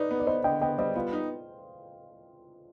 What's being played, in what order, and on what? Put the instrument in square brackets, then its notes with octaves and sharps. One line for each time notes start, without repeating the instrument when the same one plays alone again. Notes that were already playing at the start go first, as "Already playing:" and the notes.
Already playing: [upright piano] D#4 [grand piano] B4 D5
[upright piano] B3
[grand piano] D5
[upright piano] B3 [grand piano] C5 D#5
[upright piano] D3 [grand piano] D#5 G5
[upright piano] B3 [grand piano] D#5 G5
[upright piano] G3 [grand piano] C5 D#5
[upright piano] B3 [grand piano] F4
[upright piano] D#4